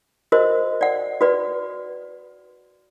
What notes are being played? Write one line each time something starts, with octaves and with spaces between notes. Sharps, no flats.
F#4 A#4 C5 D#5
D5 F#5
F#4 B4 D5